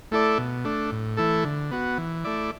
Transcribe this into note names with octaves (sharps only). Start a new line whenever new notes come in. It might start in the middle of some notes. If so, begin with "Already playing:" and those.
A3 E4 A4 D5
B2
A3 D4
A2
E3 A3 E4 A4
D3
B3 F#4
E3
A3 E4 D5